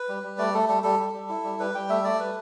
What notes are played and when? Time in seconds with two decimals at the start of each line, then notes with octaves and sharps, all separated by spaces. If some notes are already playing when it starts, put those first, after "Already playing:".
Already playing: B4
0.09 G3
0.23 G3
0.38 A3 D5
0.54 A3 A4
0.68 G3 A4
0.83 G3 A4
0.99 G3
1.14 G3
1.29 E4
1.44 G3
1.60 G3 B4
1.75 G3 G5
1.89 A3 E5
2.04 A3 D5
2.20 G3 B4